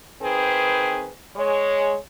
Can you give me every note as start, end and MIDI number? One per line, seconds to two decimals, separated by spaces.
0.23 1.09 51
0.23 1.09 60
0.23 1.09 68
0.23 1.09 71
1.37 1.96 56
1.37 1.96 73